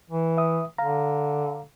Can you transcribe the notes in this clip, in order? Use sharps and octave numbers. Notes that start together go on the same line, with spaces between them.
E3
E5 D#6
D3 F5 A#5